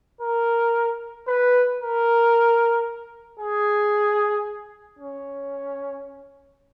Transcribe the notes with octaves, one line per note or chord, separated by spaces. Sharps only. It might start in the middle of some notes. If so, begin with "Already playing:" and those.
A#4
B4
A#4
G#4
C#4